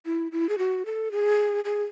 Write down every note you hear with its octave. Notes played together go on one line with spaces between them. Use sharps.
E4
E4
G#4
F#4
A4
G#4
G#4